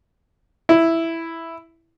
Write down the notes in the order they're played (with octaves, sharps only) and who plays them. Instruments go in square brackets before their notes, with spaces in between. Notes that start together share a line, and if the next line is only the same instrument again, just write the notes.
[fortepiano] E4